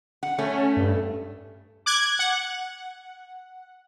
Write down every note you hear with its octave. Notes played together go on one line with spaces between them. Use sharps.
F#5
A3 C#4
G2
D6 F#6 G#6
F#5